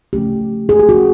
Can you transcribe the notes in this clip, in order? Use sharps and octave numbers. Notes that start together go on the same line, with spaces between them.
C#3 F3 A3 C#4 G4
G#4
G4
F3 A#3 C#4 F#4